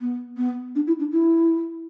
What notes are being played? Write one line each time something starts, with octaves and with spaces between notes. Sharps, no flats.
B3
B3
D4
E4
D4
E4